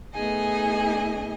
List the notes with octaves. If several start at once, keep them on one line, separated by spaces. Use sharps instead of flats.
A3 B3 D#4 G#4 D#5 G#5